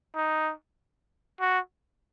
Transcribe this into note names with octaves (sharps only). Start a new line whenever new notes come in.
D#4
F#4